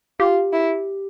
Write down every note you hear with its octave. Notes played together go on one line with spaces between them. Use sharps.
F4 G4
E4